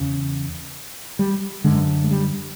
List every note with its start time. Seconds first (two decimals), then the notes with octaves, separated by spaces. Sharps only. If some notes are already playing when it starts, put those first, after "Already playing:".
Already playing: E2 C#3
1.19 G3
1.64 F#2 D3 G#3
2.04 G#3
2.11 G3